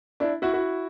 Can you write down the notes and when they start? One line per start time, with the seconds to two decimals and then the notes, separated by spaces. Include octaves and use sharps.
0.20 D4 E4
0.42 E4 F#4
0.53 E4 F#4